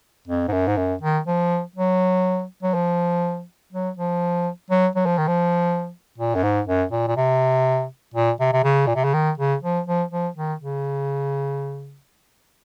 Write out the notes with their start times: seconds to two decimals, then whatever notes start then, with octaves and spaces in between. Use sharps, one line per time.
0.28 F2
0.48 G#2
0.52 F#2
0.67 G#2
0.77 F#2
1.02 D#3
1.27 F3
1.76 F#3
2.63 F#3
2.74 F3
3.72 F#3
3.97 F3
4.70 F#3
4.96 F#3
5.06 F3
5.18 D#3
5.28 F3
6.18 A#2
6.35 F#2
6.43 G#2
6.67 F#2
6.92 A#2
7.07 A#2
7.17 C3
8.14 A#2
8.40 C3
8.53 C3
8.64 C#3
8.87 A#2
8.96 C3
9.04 C#3
9.14 D#3
9.38 C#3
9.63 F3
9.86 F3
10.11 F3
10.37 D#3
10.61 C#3